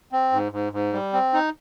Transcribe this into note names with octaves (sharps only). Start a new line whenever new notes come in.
C4
G#2
G#2
G#2
G3
C4
D#4